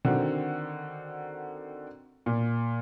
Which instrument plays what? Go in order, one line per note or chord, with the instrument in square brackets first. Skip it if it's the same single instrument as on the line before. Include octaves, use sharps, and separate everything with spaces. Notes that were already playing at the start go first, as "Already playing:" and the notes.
[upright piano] D3 D#3 C4 F#4
A#2